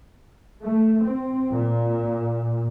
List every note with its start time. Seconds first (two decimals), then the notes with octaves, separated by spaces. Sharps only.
0.63 A3
1.04 C4
1.51 A#2